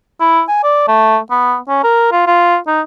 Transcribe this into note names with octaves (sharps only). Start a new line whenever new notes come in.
E4
G#5
D5
A3
B3
C#4
A#4
F4
F4
D#4